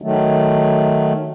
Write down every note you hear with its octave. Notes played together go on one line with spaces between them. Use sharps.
D#3 F#3 A3